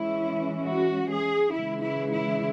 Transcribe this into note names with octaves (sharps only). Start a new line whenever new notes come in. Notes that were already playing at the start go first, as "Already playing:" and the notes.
Already playing: E3 G#3 C#4 E4
F#4
G#4
C#3 E3 G#3 E4
E4
E4